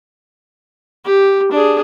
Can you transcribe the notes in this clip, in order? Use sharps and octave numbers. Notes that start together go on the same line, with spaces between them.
G4
D4 G#4